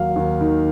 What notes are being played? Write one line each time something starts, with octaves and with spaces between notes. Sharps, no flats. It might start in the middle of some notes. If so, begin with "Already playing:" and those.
Already playing: D#2 F#3 F5
D#2
D#3